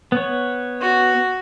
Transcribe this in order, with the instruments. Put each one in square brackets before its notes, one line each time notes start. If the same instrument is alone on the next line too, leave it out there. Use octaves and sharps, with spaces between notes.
[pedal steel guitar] B3 C#5
[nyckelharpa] F#4